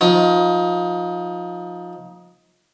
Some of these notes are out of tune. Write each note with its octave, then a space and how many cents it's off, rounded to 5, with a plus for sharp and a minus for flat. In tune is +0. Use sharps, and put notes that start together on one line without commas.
F3 +25 D#4 +25